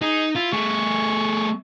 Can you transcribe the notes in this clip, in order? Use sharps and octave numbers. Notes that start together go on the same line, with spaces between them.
D#4 G#4
E4 F4
A3 G#4 C#6